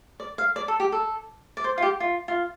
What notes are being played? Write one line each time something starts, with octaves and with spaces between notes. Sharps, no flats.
D5
F5
D5
A4
G4
A4
D5
C5
F4
G4
F4
F4